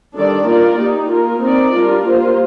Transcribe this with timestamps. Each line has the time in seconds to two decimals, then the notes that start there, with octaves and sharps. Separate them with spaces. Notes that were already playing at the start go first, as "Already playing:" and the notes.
0.15 D#3 G3 D4 A4 D5
0.47 A#3 F4 A#4 D5
0.79 A#3 D#4 G4
1.10 A#3 F4 A#4
1.42 C4 D#4 A#4 D5
1.74 G3 D4 F4 A#4
2.06 G3 A#3 F4 C5